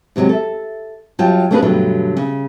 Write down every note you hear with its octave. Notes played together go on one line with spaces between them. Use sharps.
E2 C3 F#3 G#3 C#4
A4 E5
F#2 F#3 G3 F4 G5 A5
A3 A#3 C#4 D4 G#4 B4
G2 B2 D3 F#3 A3
C#3